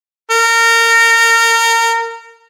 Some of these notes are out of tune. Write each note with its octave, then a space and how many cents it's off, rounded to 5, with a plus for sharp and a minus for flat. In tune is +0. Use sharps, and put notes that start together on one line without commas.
A#4 -25